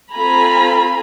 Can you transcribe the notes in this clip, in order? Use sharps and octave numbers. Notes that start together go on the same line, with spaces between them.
C4 F4 A4 G#5 A#5 B5